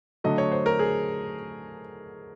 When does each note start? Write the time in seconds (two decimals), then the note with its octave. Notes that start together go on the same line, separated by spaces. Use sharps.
0.24 D3 F#3 A3 D#5
0.38 C#5
0.52 C5
0.66 A#4
0.79 G#4